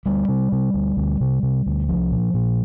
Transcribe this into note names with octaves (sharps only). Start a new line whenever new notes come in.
D2 G3
C3
C3
D2
D2
C3
C3
D2
C2 F3
A#2
A#2